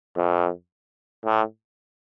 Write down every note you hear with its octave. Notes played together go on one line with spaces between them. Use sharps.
F2
A2